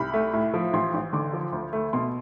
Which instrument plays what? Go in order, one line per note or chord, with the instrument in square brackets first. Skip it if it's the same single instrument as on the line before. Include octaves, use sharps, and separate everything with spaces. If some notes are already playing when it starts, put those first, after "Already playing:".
Already playing: [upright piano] C2 B5
A3
A2
F3
A1 C6
A1
D3 D6
F3
D2
A3
B2 C6